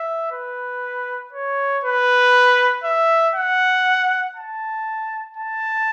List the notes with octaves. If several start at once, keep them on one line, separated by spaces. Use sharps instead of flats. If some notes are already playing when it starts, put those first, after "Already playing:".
Already playing: E5
B4
C#5
B4
E5
F#5
A5
A5